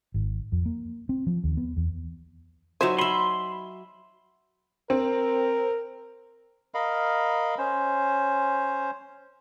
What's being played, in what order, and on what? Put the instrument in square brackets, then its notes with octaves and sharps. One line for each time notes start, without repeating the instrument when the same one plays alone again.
[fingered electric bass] G#1
F2
A#3
C4
F3
D#2
B3
E2
[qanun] F#3 E5 G#5 [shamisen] D#4 C5
[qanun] E5 G#5 [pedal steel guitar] B5 C6
[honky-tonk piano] C4 [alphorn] A#4
[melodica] A#4 D#5 F5 B5
C#4 C5